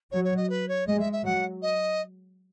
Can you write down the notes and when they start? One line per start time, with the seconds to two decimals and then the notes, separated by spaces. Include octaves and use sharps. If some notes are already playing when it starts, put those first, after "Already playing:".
0.11 F#3 C#5
0.24 C#5
0.36 D#5
0.50 B4
0.68 C#5
0.87 G#3 D#5
0.99 E5
1.12 E5
1.25 F#3 F#5
1.62 D#5